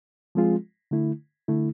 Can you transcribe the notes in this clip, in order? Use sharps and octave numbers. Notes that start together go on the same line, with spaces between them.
F3 G#3 C4 F4 G#4
D3 A3 E4
D3 A3 E4